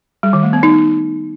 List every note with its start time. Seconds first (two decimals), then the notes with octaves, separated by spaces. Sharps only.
0.23 G3
0.33 D#3
0.43 A3
0.53 B3
0.63 D#4